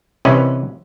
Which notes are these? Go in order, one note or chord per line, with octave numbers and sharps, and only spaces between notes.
C2 C3 E3 C#4 B4 D#5